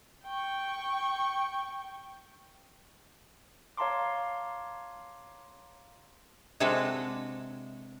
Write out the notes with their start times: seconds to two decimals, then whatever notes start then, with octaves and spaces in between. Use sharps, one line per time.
0.25 G5 C#6
3.77 C#5 F5 A5 A#5 C6 D6
6.60 C3 G#3 D4 F#4 A4 B4